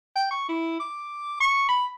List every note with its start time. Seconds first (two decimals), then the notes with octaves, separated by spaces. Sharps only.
0.16 G5
0.30 C#6
0.48 E4
0.79 D6
1.40 C#6
1.69 B5